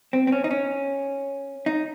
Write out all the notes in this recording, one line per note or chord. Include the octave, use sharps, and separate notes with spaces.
C4
C4
C#4
D#4
C#4
D#4